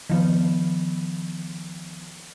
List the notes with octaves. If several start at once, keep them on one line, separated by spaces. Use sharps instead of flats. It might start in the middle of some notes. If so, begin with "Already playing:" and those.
D#3 F3 B3